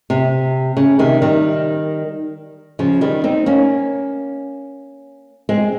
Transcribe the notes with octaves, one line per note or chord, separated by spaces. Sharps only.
C3
C#3
C3 D#3
D#3 G3
C#3 F3
D#3 G3
C4 D#4
A#3 C#4
G#3 C4